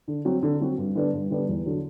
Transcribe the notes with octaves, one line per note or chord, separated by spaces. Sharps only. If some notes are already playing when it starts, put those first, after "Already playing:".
D3
F#3 C4 F#4
D3
F#3 C4 F#4
G2
D3 G3 B3 D4
G2
D3 G3 B3 D4
E2
D3 F#3